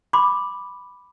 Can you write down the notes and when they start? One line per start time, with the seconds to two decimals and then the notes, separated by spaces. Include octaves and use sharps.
0.13 B5 C6 D6